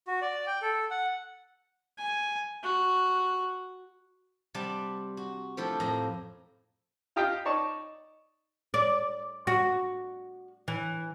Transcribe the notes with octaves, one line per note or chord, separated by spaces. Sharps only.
F#4
D5
G5
A4
F#5
G#5
F#4
C3 G3 D5 F#5 A5
F#4
F3 A3 E4 G4
F2 A2 A#5
F4 G4 D#5 F5 G5
D#4 C#5 D5 A5 C#6
D5
F#4
E3